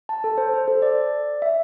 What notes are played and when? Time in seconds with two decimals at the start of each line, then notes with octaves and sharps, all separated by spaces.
0.09 A5
0.24 A4
0.38 C5
0.53 C5
0.68 A4
0.82 D5
1.42 E5